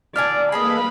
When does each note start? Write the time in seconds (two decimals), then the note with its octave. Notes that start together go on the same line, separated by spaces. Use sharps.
0.16 A#2 D3 D5 G#5 F6
0.52 A#3 G#4 A4 B4 D#5 F5 B5